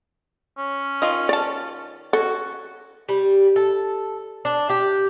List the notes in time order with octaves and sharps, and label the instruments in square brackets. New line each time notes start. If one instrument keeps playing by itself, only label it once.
[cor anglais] C#4
[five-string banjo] D#3 F4 D#5
[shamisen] D5 A5
[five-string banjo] C#4 [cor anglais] F#4 [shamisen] A4
[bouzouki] G3
A4
D4
G4